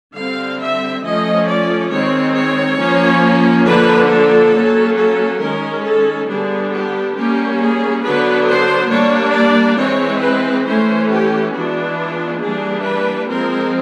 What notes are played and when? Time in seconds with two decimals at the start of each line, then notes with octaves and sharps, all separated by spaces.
0.17 D3 G3 C4 F5
0.60 E5
1.04 F3 A3 C#4 D#5
1.48 D5
1.91 D#3 G#3 C4 C#5
2.36 C#5
2.79 F3 A#3 C#4
3.66 D3 F3 A#3 D4 B4
4.10 A4
4.55 F#3 A#3 C#4
4.98 A4
5.41 D#3 G#3 C#4 A#4
5.86 A4
6.29 D3 G3 B3 D4 G#4
6.73 G4
7.17 G3 A#3 C#4 G4
7.61 G#4
8.04 D3 F#3 B3 D4 B4
8.48 C5
8.92 G3 A#3 D4 C#5
9.35 D5
9.79 E3 G#3 C4 C#5
10.23 B4
10.67 E3 A3 C#4 C5
11.10 G4
11.54 E3 G#3 B3 D4 F#4
11.98 F4
12.42 E3 G3 A#3 D4 G#4
12.86 B4
13.29 F3 G#3 C4 A#4